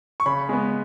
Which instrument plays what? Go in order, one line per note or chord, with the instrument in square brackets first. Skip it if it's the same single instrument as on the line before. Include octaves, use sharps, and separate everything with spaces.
[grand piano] C#6
C#3 B5
G#3 B3